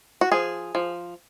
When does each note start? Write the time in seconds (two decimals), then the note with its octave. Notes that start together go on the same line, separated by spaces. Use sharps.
0.21 F#4
0.32 F3 G#4
0.75 F3